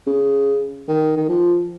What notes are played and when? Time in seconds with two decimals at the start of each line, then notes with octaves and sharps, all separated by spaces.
0.07 C#3
0.88 D#3
1.17 D#3
1.29 F3